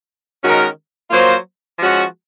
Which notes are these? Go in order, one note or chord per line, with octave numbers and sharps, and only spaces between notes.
D#3 G#3 C#4 F#4 A#4
F#3 A#3 F4 C5
F3 G#3 C#4 F#4